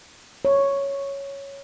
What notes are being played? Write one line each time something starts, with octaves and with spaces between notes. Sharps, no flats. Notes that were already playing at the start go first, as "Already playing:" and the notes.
C#5